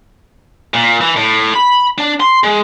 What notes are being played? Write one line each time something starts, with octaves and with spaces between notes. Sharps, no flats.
A#2
E3
A2
B5
D4
C6
G#3